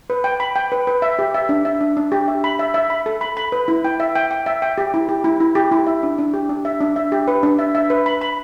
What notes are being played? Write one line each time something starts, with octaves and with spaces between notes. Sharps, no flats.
B4
G5
B5
G5
B4
B4
E5
G4
E5
D4
E5
D4
D4
G4
E5
B5
E5
E5
B5
A4
B5
B5
B4
E4
G5
E5
G5
G5
E5
G5
G4
E4
G4
E4
E4
G4
E4
E5
D4
D4
G4
D4
E5
D4
E5
G4
B4
D4
E5
E5
B4
B5
B5